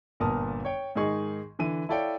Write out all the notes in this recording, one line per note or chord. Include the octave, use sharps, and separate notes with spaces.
G1 A#2 B3 A#4 A5 D#6
C#5 G5
G#2 D#3 D#4 G#4 C#6
D3 E3 D#7
E4 A4 C#5 D5 F5 G5